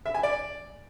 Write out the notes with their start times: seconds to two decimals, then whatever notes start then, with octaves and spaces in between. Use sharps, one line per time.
0.06 E5
0.14 G#5
0.23 D5